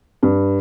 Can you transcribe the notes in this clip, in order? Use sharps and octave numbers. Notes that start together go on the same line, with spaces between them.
G2